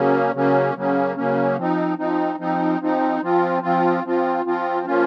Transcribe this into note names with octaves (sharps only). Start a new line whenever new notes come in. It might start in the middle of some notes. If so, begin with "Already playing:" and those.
Already playing: C#3 F#3 A#3 C#4
C#3 F#3 A#3 C#4
C#3 F#3 A#3 C#4
C#3 F#3 A#3 C#4
F3 C4 D#4
F3 C4 D#4
F3 C4 D#4
F3 C4 D#4
F3 C4 F4
F3 C4 F4
F3 C4 F4
F3 C4 F4
F3 A#3 C#4 F4